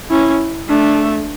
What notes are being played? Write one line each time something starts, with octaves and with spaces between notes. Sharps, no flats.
C#4 E4
A3 D4